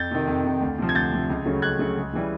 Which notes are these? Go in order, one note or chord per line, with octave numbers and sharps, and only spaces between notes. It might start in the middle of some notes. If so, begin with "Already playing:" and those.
Already playing: F2 G6 A6
C3 D#3
F2
C3 D#3
D2
C3 F3
G#6
D2 G6 A6
C3 F3
C#2
C#3 F#3 A3
C#2 F#6 G#6
C#3 F#3 A3
C#2
C#3 E3 G3